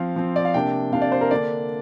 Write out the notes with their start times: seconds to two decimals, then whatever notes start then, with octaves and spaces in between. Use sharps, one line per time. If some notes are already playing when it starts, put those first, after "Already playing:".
Already playing: F3 C4 F5
0.16 F3 C4
0.36 D5
0.45 F5
0.54 C3 A#3 D4 G5
0.92 C3 A#3 D4 F5
1.02 D5
1.12 C5
1.21 A#4
1.31 D3 A#3 D4 D5